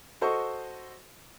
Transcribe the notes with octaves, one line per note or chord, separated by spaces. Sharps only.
F#4 A4 C5 D#5 C#6